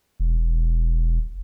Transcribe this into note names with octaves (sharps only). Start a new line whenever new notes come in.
E1